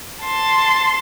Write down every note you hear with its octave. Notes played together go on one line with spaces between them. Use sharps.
A5 C6